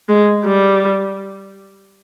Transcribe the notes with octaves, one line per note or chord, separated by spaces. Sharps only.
G#3
G3